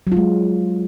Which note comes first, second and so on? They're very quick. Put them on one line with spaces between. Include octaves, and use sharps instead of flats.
F#3 F4 G#3